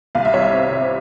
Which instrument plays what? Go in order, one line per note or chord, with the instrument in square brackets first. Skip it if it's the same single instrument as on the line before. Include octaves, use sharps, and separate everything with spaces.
[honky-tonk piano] C2 F5
E5
G3 C#5
E5
C4
C3